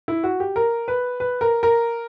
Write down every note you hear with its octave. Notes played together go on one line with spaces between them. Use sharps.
E4
F#4
G4
A#4
B4
B4
A#4
A#4